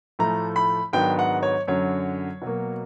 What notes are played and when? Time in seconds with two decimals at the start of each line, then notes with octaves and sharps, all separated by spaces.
0.19 A2 F3 A3 A#5
0.56 B5
0.93 G#2 D#3 F#3 B3 D4 G5
1.19 F#5
1.43 C#5
1.67 F#2 D3 F#3 C#5
2.42 B2 F#3 A#3